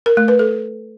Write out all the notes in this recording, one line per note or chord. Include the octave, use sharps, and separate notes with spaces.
A#4
A3
B4
A4